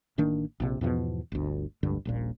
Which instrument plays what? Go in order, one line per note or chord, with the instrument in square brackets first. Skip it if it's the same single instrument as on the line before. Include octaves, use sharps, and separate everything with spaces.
[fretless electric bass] A1 D#3 A#3 D4
A#1 C3
E2 G#2 B2 F3
G1 D2
F1 C#2 G2 D3
D#1 A#1 A#2